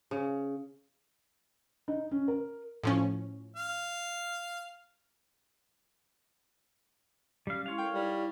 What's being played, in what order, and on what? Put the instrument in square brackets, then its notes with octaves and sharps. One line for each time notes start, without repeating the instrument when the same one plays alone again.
[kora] C#3
[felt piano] D#4
C#4
A#4
[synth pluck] A2 F3 C#4
[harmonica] F5
[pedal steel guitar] G3 F5 [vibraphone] C#4 G4
[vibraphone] G#3 E4 C6 [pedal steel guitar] C#5 F5
[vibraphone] A4 A#4 [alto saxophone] G5
[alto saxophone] G3 [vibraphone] D#4 E4